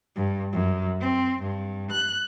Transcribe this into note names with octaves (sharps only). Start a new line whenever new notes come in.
G2
F#2
C4
G2
F#6